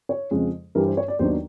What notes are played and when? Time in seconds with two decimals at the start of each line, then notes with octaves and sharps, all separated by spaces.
0.09 C#5
0.31 F2 C#3 F3 G#3
0.75 G2 E3 G3 A#4
0.86 C5
0.97 C#5
1.08 D5
1.19 D#2 D#3 F#3 B3 D4 C5